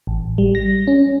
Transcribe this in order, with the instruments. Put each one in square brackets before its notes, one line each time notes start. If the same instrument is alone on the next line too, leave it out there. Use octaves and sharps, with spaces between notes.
[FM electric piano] A1
G3
A#6
C#4